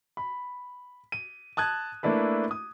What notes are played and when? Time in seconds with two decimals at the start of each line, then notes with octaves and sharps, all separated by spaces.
0.17 B5
1.12 D#7
1.57 A5 D#6 F#6 G#6
2.03 A3 A#3 D4 E4 B4
2.51 D#6